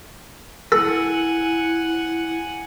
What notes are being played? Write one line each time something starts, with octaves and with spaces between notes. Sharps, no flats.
E4 A4 F#5 G#5